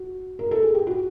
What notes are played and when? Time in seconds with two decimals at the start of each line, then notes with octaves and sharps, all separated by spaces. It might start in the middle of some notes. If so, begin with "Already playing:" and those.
Already playing: F#4
0.39 A#4
0.51 A4
0.63 G#4
0.75 G4
0.87 F#4